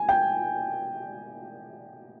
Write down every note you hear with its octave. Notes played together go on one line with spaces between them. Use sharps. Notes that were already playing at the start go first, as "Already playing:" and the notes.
Already playing: G#5
G5